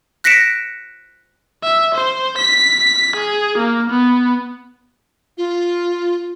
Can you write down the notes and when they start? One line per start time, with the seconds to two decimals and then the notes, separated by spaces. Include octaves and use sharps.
0.24 F#6 A#6 B6 C#7 D7 E7
1.63 E5
1.95 C5
2.38 B6
3.16 G#4
3.58 A#3
3.90 B3
5.38 F4